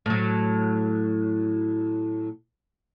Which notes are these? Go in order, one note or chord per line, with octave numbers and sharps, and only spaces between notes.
A2 F#3